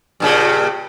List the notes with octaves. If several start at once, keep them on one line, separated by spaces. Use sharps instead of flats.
G2 A#2 C#3